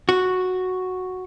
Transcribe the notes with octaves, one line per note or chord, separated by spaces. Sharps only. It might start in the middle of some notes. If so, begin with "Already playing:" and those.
F#4